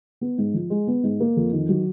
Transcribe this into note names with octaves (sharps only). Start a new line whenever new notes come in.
B3
G#2
F3
G#3
B3
G#2
A#3
F2
D#3
F#3